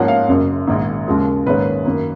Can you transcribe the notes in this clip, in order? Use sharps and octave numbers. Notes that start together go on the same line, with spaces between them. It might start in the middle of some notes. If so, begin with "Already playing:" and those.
Already playing: G#2 F3 A#3 C#4 F#5
F5
F#1 F#2 C#3
A#1 G#2 D#3 A#3
D#2 C#3 F3 G#3
A#1 G#2 D#3 A#3 C#4 B4
F#2 D#3 A#3